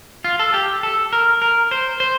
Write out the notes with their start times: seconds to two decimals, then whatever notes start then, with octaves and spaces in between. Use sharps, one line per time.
0.24 F4
0.39 A4
0.54 G4
0.83 A4
1.13 A#4
1.42 A#4
1.71 C5
2.00 C5